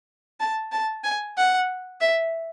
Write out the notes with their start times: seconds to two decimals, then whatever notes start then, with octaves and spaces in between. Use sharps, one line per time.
0.40 A5
0.72 A5
1.04 G#5
1.37 F#5
2.01 E5